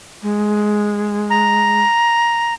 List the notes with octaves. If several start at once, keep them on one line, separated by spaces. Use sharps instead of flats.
G#3
A#5